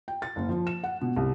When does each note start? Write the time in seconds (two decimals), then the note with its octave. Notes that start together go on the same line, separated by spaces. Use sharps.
0.08 G5
0.22 A6
0.36 F#1
0.49 F3
0.67 E7
0.83 F#5
1.02 B2
1.16 C2